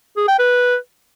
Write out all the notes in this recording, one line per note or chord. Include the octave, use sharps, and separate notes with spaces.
G#4
G5
B4